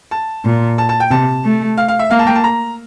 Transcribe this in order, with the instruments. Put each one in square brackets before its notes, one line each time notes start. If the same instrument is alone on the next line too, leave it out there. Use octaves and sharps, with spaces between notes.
[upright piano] A5
[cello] A#2
[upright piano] A5
A5
G5
[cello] C3 [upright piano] A5
[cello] A3
[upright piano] F5
F5
E5
[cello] A#3 [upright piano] F5
[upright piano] A5
G5
A5
A#5